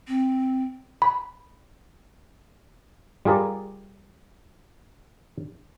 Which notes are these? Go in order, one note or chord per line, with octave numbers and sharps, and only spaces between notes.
C4
B5
G3 F4 G#4 A#4 D5